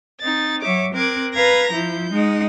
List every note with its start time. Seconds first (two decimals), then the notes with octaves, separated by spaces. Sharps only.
0.21 C4 D#4 A6
0.61 F#3 C#5 E5 D6
0.92 C4 A#4 D6 F#6 G#6
1.33 B4 F5 A#5 G#6 A#6
1.71 F3 E4 G6
2.09 G#3 D#4 F#5